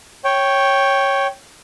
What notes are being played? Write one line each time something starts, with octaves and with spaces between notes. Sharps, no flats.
C#5 G5